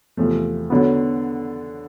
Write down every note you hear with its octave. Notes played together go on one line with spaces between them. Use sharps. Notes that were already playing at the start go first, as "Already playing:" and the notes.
E2 C3 F3 A3
D3 F#3 B3